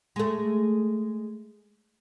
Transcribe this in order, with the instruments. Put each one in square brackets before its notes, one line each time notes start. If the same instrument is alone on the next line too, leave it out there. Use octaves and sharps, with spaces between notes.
[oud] G#3 A3